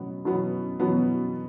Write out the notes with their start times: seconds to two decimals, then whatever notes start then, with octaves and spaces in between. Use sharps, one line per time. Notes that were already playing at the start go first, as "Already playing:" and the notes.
Already playing: B2 F#3 B3
0.25 B2 F#3 B3
0.80 B2 F#3 B3